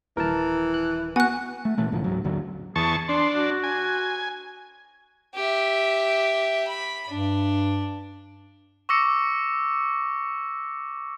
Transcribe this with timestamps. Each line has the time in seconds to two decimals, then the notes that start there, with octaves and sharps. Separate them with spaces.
0.17 D#1 E3 A#4 A5
0.74 F#6
1.16 B3 F#4 F#5 G#5 F#6
1.65 A3
1.78 A#2 E3 A3
1.92 C2 A2 D3 F3
2.04 C#2 G#2 F#3
2.24 G#1 D#2 D3 F#3
2.76 E2 G#4 A5 C#6
3.09 E3 D4 D5 C6
3.35 F#4
3.63 G#5
5.35 G4 E5
6.67 B5
7.08 G2 D4
8.89 C#6 D6 E6 A#6 C#7